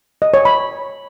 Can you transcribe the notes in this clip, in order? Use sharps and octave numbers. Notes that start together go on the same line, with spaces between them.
D#5
C#5
B5